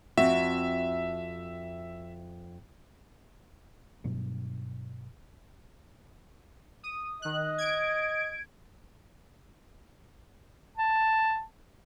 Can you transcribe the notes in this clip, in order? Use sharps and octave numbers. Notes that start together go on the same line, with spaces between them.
F2 C4 F#4 E5
G2 B2 F#3 D4
D#6
D#3 D#5 F#6
G#6 D7
A5